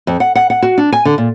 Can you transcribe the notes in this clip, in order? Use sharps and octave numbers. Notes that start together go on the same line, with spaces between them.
F2
F#5
F#5
F#5
F#4
D4
G#5
D3
A#2